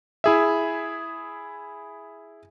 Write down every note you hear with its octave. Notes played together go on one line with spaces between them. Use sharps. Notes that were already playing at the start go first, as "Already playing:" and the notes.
E4 G#4 E5